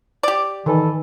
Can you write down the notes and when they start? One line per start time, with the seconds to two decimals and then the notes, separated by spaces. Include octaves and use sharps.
0.23 G4 D5
0.66 D#3 E3 A4